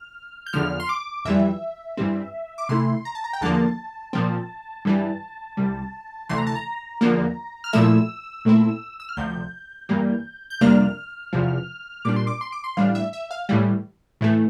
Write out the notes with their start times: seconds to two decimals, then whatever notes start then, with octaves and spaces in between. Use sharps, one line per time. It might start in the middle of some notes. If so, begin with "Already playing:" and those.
Already playing: F6
0.46 G6
0.53 E2 D3 F3 F6
0.80 C6
0.89 D6
1.25 F2 E3 G3 E5
1.97 G2 E3 G3 C4
2.58 D6
2.69 C3 E3 A3 E4 C6
3.05 A#5
3.15 A5
3.24 A#5
3.33 G5
3.41 E2 D3 F3 A#3 A5
4.13 A#2 F3 C4
4.85 G2 E3 G3
5.57 C2 C3 G3
6.29 D2 C3 E3 A3 C6
6.38 A#5
6.47 A5
6.55 A#5
7.01 E2 D3 F3 A#3
7.64 F6
7.73 A#2 F3 A3 E4 E6
8.45 A#2 A3 C4 E4
9.00 E6
9.09 F6
9.17 D2 C3 F3 G6
9.89 G2 E3 G3 A#3
10.50 G6
10.61 F2 C3 G3 A#3 D4 F6
11.33 E2 C3 F3
12.05 A#2 G3 D4 D6
12.16 C6
12.27 D6
12.41 C6
12.52 D6
12.64 C6
12.77 A2 E3 G3 D4 F5
12.95 E5
13.13 E5
13.31 F5
13.49 A2 E3 G3
14.21 A2 E3 A3